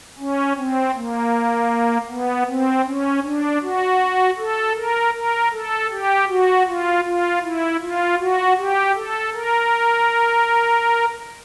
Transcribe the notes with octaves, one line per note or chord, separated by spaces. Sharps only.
C#4
C4
A#3
B3
C4
C#4
D4
F#4
A4
A#4
A#4
A4
G4
F#4
F4
F4
E4
F4
F#4
G4
A4
A#4